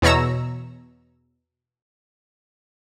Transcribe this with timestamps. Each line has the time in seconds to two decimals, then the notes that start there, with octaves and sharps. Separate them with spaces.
0.02 E2 B2 C#5 A#5 E6